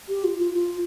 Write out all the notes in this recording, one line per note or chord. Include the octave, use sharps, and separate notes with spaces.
G4
F4
F4
F4